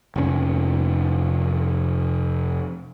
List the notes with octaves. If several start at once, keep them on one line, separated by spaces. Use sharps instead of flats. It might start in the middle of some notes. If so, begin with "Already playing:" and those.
F1 A#2 C#4